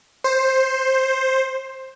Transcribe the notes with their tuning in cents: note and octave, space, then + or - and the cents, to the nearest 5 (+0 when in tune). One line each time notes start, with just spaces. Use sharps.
C5 +10